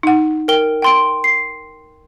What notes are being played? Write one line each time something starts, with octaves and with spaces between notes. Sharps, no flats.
D#4 F#5
A#4 G5 G7
G5 C6 D7
C7